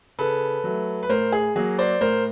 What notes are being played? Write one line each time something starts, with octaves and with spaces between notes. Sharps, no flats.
C#3 A4 B4
F#3 A3
B4
A2 A#4 C5
G#4
F#3 A#3 G#4
C5 D5
A2 A#4 C5